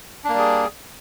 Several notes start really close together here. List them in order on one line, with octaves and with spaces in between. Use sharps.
D4 A#3 G3 G#4